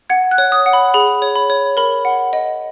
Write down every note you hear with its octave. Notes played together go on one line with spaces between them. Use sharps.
F#5 G#6
F#6
C#5
D#6
F#5
B5
G#4 B5
C#5
B5
C#5
A#4 B5
F#5
D#5